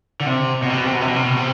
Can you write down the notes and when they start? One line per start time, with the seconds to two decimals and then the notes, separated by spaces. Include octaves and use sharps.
0.20 D3
0.26 C3
0.62 B2
0.70 C3
0.77 B2
0.85 C3
0.94 B2
1.01 C3
1.08 B2
1.16 C3
1.24 B2
1.36 C3